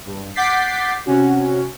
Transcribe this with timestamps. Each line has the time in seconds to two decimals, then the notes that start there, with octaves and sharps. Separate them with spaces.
0.05 G2
0.35 F#5 D6 G6 A6 B6 C7
1.06 C3 C#4 F#4